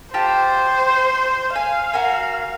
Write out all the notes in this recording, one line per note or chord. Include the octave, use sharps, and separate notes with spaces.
F4 G4 C5 A5
F5 G#5
F#4 A#4 G#5